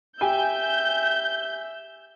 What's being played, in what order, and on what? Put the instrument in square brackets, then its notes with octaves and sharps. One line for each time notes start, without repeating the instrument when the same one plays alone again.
[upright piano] G4 G5 G#5 [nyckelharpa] E5 [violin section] G6